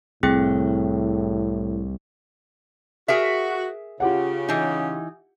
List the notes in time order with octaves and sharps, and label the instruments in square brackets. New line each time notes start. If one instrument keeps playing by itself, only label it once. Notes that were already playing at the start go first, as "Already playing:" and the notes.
[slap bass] C2 [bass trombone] A2 [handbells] C4 G#4 G5
[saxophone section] F#4 [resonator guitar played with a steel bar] G#4 A#4 E5
[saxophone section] C#3 [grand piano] F4 G4 F#5
[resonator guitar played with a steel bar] E3 D#4